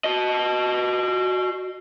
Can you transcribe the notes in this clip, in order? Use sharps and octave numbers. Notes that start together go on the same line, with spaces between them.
F#4 D#5